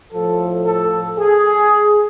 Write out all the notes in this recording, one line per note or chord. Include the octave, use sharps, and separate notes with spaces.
A2 F3 A4
A4
G#4